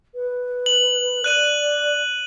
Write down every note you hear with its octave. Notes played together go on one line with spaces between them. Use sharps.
B4
F#7
D5 F#6 D#7 F#7